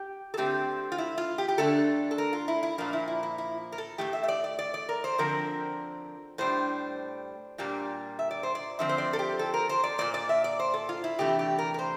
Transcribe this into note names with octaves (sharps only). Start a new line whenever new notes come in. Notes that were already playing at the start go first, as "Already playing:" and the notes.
Already playing: G4
A4
D3 A3 C4 G4
F4
E4
F4
G4
G4
D3 A3 D4 A4
A4
A#4
F4
E4
E4
A#2 F3 A#3 D4
E4
E4
E4
E4
A#4
A4
A2 F3 A3 G4
E5
E5
D5
D5
D5
D5
A#4
C5
D3 F3 C4 A#4
A2 G3 D4 C5
A#2 G3 A#3 D4
E5
D5
C5
D5
D3 F3 C4 E5
C5
D5
A4
G4
A4
A#4
C5
D5
A#2 F3 A#3 D5
D5
E5
D5
C5
A4
F4
E4
C3 E3 A3 D4 G4
G4
A#4
A#4
C5